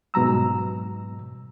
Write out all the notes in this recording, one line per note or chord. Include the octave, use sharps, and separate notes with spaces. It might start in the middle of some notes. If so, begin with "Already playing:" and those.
G#2 B2 F#3 A#5 E6